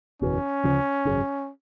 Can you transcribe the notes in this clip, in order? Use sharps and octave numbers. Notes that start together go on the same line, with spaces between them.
F#1 E2 B2 C#4
D2 C#3 F3
G#1 F#2 C#3